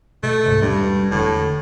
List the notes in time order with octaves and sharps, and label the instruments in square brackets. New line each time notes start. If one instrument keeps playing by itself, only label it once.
[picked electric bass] B2 [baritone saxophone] A3
[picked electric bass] C#2 G#2 C3
[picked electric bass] E1 G3 D4 [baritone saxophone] G2
[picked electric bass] E1 D3 [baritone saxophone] A2